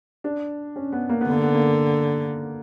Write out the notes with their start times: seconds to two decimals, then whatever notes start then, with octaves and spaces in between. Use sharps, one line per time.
0.24 D4
0.76 C#4
0.92 B3
1.09 A#3
1.21 B3
1.27 D3 A#3
1.42 B3
1.54 A#3